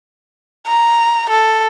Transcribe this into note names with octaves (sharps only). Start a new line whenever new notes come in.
A#5
A4